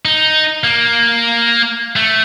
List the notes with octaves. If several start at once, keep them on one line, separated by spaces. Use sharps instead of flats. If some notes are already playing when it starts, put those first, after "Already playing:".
D#4
A#3
A3